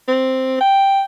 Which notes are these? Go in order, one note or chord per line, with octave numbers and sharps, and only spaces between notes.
C4
G5